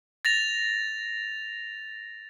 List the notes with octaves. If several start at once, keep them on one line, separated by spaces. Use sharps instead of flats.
A6 A#6 F7